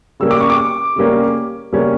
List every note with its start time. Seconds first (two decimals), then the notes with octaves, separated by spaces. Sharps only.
0.20 C#3 G3 A#3 C#4 E6
0.31 D6
0.40 C#6
0.50 D6
0.96 C#3 G3 A#3 C#4
1.73 C#3 G3 A#3 C#4